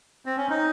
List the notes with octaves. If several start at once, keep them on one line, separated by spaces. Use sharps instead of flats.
C4
C#4
D#4